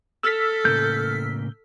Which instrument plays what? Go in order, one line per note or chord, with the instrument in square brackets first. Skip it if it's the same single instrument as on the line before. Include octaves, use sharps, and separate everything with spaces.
[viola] A4 [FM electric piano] E6 F6 B6
[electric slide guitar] A2 C#3 A#3 [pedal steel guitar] G6